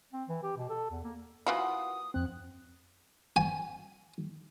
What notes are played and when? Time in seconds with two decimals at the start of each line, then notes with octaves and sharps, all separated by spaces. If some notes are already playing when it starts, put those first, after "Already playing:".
0.13 C4
0.29 E3
0.43 G4
0.57 B2
0.70 A4
0.91 E2
1.04 A#3
1.47 E3 A#3 F4 F#4 B4 F#5 D#6
2.14 F2 C4 F#6
3.36 G#5